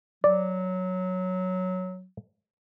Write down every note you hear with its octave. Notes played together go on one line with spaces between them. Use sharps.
F#3 D5